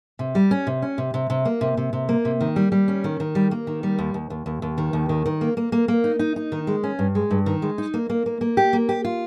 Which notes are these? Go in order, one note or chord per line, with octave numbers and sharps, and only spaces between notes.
C3
G3
C#4
C3
C#4
C3
C3
C3
A#3
C3
C3
C3
A#3
C3
D#3
G3
G3
C#4
D#3
D#3
G3
A#3
D#3
G3
D#2
D#2
D#2
D#2
D#2
D#3
D#2
D#3
D#3
A#3
A#3
A#3
A#3
D#4
D#4
D#4
D#3
G#3
C#4
G2
G#3
G2
D#3
G#3
D#4
A#3
A#3
A#3
A#3
G4
A#3
G4
F4